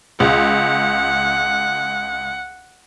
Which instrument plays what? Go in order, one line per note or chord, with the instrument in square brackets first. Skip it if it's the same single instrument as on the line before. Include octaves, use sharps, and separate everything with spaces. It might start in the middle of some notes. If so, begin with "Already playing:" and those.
[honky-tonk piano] C#2 [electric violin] F#5